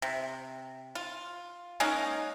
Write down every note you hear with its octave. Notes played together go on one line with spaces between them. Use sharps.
C3
F4
G#3 A#3 C#4 D#4